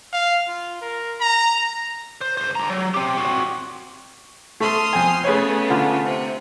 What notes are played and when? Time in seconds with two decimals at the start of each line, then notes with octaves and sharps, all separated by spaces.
0.12 F5
0.47 F4
0.81 A#4
1.20 A#5
2.21 C5
2.37 C#2 C5
2.55 D3 A#5
2.70 F#3
2.94 C4 G4
3.18 C4 F#4
4.60 A3 A4 C6 D#6 F6
4.93 F2 G#5
5.24 C#3 A3 B3 G#4 B4 C#5
5.70 D3 F4
6.04 C3